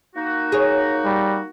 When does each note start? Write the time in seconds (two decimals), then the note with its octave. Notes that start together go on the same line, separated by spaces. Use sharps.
0.15 A#3 D#4 F#4
0.52 G#4 C#5
1.05 G3